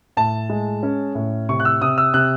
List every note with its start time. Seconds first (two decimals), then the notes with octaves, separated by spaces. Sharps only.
0.17 A2 A5
0.49 G#3
0.83 C#4
1.15 A2
1.49 C3 C#6
1.60 F#6
1.65 E6
1.81 C3 D#6
1.98 E6
2.14 C3 F#6